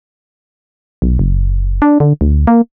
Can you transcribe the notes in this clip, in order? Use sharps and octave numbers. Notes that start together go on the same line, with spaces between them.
B1
F#1
D4
D3
D2
A#3